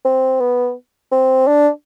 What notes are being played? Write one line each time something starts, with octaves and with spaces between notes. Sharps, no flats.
C4
B3
C4
D4